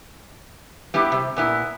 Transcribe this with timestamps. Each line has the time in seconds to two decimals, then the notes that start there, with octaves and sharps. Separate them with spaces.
0.94 G3 B3 E4 G4
1.12 C3
1.36 A#2 B3 E4